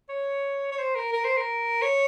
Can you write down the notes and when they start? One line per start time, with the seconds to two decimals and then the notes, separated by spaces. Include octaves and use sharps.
0.09 C#5
0.72 C#5
0.78 C5
0.95 A#4
1.13 A#4
1.24 C5
1.37 A#4
1.82 C#5